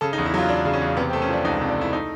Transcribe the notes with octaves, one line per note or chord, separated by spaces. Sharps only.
C#3 A4
D#4
E2
E4
F#3 F4
E2 D4
C#3
C#4
E2
C3 B3
C4
A3
C#4
F3 D4
C#2 D#4
C3
D4
A3 E4
D#4